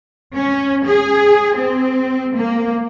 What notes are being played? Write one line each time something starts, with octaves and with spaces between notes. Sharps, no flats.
C#4
G#4
C4
A#3